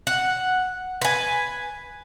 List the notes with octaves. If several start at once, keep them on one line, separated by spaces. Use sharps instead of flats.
F#5
B4 G#5